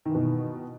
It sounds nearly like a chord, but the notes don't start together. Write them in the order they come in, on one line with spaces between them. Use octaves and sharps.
D#3 E3 B2